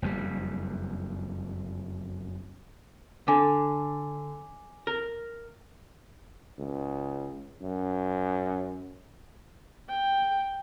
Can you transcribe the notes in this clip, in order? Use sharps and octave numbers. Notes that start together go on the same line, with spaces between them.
F#1 F2 C#3 G3
D3 G#5 D6
A#4
C#2
F#2
G5